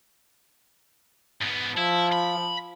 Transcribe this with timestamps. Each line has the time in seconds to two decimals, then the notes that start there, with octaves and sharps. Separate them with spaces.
1.41 G#2 B3
1.77 F3 E4
2.13 B5